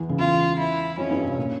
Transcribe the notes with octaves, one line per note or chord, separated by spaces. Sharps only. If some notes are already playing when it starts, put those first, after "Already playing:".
Already playing: E2 E3
C#2 C#3
E2 E3 F4
E4
F2 F3 C#4
G2 G3
C3
A#2